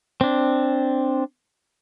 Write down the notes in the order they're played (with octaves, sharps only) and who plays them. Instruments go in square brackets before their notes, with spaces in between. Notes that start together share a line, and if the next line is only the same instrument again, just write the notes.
[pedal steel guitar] C4 D4